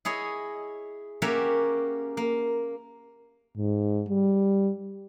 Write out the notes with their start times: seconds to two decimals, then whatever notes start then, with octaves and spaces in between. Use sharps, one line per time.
0.05 E4 G#4 C#5 D#5
1.22 A#3 C#4 F#4 G4 C#5 E5
2.17 A#3
3.57 G#2
4.09 G3